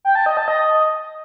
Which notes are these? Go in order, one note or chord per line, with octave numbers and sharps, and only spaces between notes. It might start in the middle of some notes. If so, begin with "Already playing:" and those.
G5
A5
D#5
A5
D#5